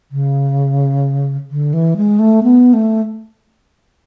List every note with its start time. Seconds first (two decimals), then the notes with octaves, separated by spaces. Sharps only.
0.12 C#3
1.51 D3
1.73 E3
1.97 G#3
2.19 A3
2.43 B3
2.73 A3